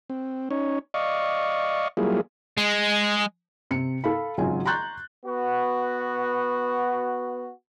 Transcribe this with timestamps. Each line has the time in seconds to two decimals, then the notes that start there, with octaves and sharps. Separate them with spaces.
0.10 C4
0.51 C#4 D#4 C#5
0.94 D5 D#5 F5 C#6
1.97 F#3 G3 A#3 E4 F4 G#4
2.57 G#3
3.71 C3 C#7
4.04 A4 F5 B5
4.38 G#1 C#3 F#3 F4 G#5
4.66 A#5 C6 C#6 F#6 G6 A6
5.24 B3 F#4